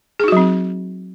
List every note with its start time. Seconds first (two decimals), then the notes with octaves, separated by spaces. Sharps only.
0.20 G#4
0.24 D#4
0.28 F#4
0.32 F#3
0.37 C4